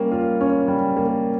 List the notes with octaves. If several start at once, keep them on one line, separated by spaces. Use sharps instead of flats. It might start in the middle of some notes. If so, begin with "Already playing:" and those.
Already playing: G3 A#3 C#4
F4
C#4
G3
A#3